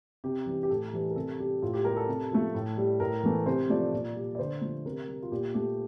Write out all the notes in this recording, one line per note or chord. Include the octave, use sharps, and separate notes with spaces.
C3 G4
E3 G3
G4
A2 A4
E3 G3
A#4
C3 A4
G3 G4
A2 F4
G4
G3 A#4
A4
C3
F3 A3
A2
G3
A2 A#4
E3 A3
C3 C5
F3 A3 D5
A#2
G3
D5
D3 C5
F3 A3
C3 A#4
G3
F4
A#2 G4
A3 G4